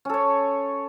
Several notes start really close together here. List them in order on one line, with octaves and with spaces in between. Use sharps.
C#4 A4 C#5